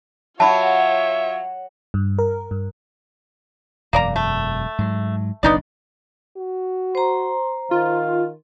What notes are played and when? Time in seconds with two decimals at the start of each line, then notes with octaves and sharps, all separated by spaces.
0.40 F#3 F4 C#5 E5 A5 B5
1.94 G2
2.19 A#4
2.51 G2
3.93 E1 F#2 A#3 D5 A#5
4.16 A3
4.79 G#2 F#3
5.43 F#1 B1 B3 D4 D#4 D5
6.37 F#4
6.95 C5 A#5 C6
7.71 D#3 F4 F5